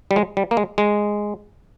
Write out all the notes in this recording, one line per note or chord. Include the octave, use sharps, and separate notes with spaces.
G3
G#3
G3
A#3
G#3
G#3